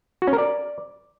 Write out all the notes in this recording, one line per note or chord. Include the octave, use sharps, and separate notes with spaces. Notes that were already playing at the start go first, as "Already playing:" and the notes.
F#4
C#4
A#4
D5